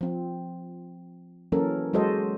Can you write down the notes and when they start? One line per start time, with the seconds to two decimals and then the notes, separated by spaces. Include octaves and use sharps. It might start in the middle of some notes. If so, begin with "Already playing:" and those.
0.01 F3 C4
1.52 E3 F#3 A#3 C#4 A4 A#4
1.93 F#3 G#3 F#4 A4 C5 D#5